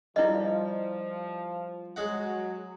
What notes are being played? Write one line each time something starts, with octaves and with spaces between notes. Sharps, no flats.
F3 G3 E4 D5 D#5
F#3 G#3 F#4 F#5